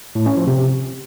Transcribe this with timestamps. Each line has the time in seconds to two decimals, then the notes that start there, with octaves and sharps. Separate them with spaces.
0.15 A2
0.26 C#4
0.37 F3
0.47 C3